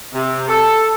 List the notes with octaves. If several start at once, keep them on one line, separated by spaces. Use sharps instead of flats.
C3
A4